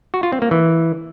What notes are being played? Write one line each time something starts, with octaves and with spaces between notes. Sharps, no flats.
F#4
F4
C4
A#3
E3